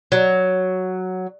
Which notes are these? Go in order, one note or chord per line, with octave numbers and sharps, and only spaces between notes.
F#3